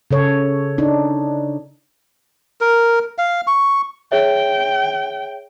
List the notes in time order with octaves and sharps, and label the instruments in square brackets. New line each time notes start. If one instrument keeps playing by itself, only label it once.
[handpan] C#3 A4 C#5
D4 D#4
[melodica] A#4
F5
C#6
[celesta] G#4 C#5 E5 [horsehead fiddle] G5